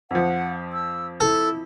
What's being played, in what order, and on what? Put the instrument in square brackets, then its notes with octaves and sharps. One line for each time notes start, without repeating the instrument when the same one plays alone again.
[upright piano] F2 F3 [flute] F#5
[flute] E6
[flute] E4 [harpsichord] A4